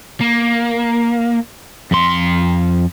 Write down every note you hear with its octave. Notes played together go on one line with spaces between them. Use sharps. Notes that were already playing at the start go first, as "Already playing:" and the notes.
A#3
F2 C6